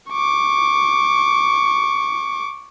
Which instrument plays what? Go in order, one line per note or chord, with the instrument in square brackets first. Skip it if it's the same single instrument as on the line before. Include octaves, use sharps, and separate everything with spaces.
[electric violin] C#6 D6